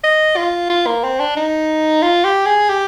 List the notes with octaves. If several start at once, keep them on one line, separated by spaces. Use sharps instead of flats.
D#5
F4
F4
A#3
C4
D4
D#4
F4
G4
G#4
G4